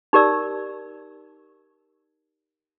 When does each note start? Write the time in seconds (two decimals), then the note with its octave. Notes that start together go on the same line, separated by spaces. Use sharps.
0.13 D#4 G4 A#4 D5 E6